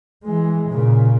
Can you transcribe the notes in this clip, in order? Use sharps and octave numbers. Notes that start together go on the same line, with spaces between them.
E3 G#3
A#2 C#3